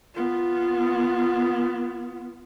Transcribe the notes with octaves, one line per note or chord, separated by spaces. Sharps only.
B3 F4